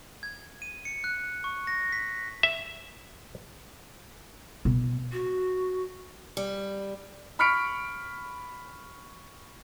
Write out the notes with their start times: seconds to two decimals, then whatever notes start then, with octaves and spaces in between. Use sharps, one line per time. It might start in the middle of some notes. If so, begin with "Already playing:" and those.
0.23 G#6
0.62 D#7
0.85 C#7
1.04 F#6
1.44 C#6
1.67 A#6
1.92 B6
2.43 E5
4.65 B2
5.12 F#4
6.37 G3
7.39 B5 C#6 F6 B6 C#7 D7